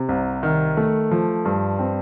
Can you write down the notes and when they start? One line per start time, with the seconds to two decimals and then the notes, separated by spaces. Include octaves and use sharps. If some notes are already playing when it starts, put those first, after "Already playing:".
Already playing: C3
0.09 C2
0.43 D#3
0.77 A3
1.11 F3
1.45 G2
1.79 C4